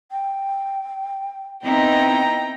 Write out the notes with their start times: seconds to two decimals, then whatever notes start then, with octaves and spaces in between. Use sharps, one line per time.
0.12 G5
1.64 B3 C4 D#4 E4 G5 A#5